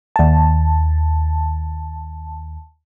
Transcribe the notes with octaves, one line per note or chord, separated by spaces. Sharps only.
D#2 A5